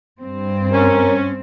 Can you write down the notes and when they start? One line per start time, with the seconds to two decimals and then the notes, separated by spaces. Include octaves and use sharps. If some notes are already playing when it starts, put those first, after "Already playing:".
0.21 G2 C4
0.73 C#4 A#4